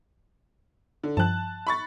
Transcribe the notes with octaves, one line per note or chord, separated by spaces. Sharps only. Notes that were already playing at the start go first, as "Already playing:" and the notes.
D3
G2 F3 G5 A5 F#6
B5 C#6 A6